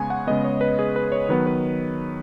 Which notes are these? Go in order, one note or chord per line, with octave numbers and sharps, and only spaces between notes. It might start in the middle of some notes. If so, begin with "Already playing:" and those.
Already playing: C#3 G#3 B3 G#5 C#6
F#5
C#3 G#3 B3 D#5
C#5
B4
G#4
B4
C#5
D#3 F#3 B3 B4
B4